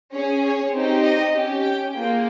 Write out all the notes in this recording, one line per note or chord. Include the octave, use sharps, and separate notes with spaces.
C#4 G#4 C#5
C#5
C4 D#4 G4
D#5
C#4 G4
G5
A#3 F4 G#4 G5